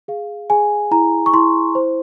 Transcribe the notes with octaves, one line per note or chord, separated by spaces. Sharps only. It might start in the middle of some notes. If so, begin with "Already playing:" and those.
G#4 F5
G#4 G#5
E4 A#5
C#6
E4 C6
C5